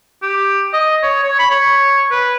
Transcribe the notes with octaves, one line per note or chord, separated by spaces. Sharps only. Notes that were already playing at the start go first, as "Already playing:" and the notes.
G4
D#5
C#5
C#5
B5
C#5
B4